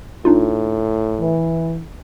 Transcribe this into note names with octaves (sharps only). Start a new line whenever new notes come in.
A2 D4 D#4 F4
E3